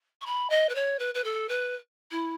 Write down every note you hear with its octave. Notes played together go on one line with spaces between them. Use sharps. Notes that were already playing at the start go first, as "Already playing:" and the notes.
C#6
B5
D#5
B4
C#5
B4
B4
A4
B4
E4